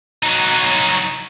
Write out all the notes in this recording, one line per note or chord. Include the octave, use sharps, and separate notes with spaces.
F#3 D#4